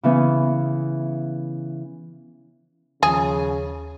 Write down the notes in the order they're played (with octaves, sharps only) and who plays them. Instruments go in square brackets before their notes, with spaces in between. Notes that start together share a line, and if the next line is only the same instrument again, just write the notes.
[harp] C#3 E3 B3
[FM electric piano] D#2 F3 [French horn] C#3 [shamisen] G#4